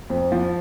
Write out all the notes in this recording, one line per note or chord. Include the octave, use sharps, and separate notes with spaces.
F2
F3